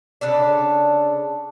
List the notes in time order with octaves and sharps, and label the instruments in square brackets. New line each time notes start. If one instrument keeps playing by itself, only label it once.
[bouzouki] C#3 D4 A4 D5